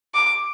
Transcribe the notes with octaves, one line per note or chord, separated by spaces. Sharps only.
D6